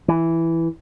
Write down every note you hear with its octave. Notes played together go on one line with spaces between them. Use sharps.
E3